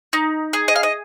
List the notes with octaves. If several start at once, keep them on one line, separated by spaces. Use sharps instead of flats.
D#4
G#4
D#5
F5
D#5